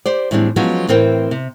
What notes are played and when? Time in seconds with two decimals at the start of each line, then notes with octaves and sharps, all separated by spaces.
0.06 G4 C5 D5
0.31 A2 E3 G3 G#3 C4 D4
0.56 F3 F#3 G#3 B3 C#4
0.88 A2 E3 C4 A#4 C5 G5
1.31 C3